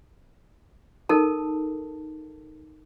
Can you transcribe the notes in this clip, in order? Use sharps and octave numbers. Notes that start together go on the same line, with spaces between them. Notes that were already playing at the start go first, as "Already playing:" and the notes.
D#4 A4 A#4 A5